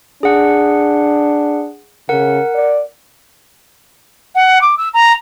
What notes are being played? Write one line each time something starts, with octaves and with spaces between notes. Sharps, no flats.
D4 G#4 F#5
C#3 A#4 F#5
D5
F#5
D6
E6
A#5